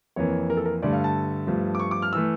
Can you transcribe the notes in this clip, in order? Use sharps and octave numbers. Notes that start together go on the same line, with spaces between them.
F2 E3 A#3 C#5
A#4
A4
A#4
G2 D3 A3 D5
F5
A5
G2 F3 A3
D6
C#6
D6
F6
E3 A3 E6